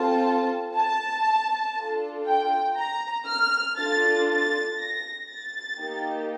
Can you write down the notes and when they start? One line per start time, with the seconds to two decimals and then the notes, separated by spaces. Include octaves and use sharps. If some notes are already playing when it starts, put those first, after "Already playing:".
Already playing: C4 F4 A4 A5
0.76 A5
1.77 D4 F4 A4
2.27 G5
2.76 A#5
3.27 F6
3.77 D4 F4 A4 A6
4.28 A6
4.78 A#6
5.28 A6
5.78 A#3 D#4 G4